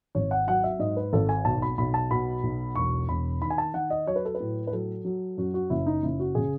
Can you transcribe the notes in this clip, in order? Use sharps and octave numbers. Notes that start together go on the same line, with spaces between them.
G#1 C#5
F#5
F#3 F#5
E5
G#2 D#5
B4
G#1 A4
G#5
B1 A5
B5
B1 B5
A5
B2 B5
B1
E1 C#6
E1 B5
D#3 B5
G#5
A5
D#3 F#5
D#5
F#3 C#5
B4
A4
B4
A2
B4
F#3 A4
F#3
F#2 F#4
F#4
F#1 E4
D#4
F#1 E4
F#4
C#3 G#4